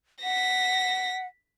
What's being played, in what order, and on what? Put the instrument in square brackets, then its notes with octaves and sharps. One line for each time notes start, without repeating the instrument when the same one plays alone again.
[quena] F#5 [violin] A#6 B6